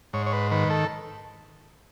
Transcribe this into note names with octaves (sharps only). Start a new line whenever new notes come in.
G#2 C#5
C#5
B4
D#3 B4
A4